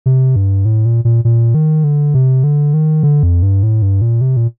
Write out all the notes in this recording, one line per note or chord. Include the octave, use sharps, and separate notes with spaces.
C3
G2
A2
A#2
A#2
A#2
D#3
D3
C3
D3
D#3
D3
F2
G2
A2
G2
A#2
C3
A#2